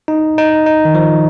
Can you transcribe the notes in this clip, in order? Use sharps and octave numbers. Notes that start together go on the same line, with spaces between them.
D#4
D#4
D#4
D#3
F3